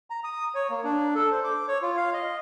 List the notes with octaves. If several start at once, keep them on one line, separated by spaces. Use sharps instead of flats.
A#5
D#6
C#5
A#3
D4
A4
C5
D6
C#5
F4
F5
D#5